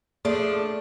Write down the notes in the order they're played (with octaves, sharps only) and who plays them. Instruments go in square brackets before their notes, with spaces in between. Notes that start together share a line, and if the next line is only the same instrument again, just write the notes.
[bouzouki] F3 D4 [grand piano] A3 [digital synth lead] G#4